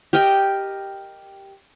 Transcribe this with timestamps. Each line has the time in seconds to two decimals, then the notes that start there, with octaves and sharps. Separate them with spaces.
0.13 G4 A#4 D#5 G5